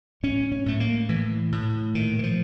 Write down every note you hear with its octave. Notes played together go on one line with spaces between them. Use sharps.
A2 C#4
C#4
A2 A3
A#3
A2 E3
A2
A#2 D#3
E3
F3